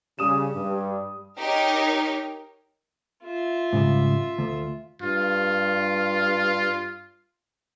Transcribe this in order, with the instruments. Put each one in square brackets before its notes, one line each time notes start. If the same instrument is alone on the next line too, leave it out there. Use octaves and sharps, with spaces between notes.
[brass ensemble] C#3 [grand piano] G3 D#6 E7 [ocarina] G4
[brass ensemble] G2
[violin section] D#4 G4 A#4 C#5
[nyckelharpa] F4 E5
[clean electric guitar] G#2 C#3 G3
D2
[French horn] G2 [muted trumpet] F4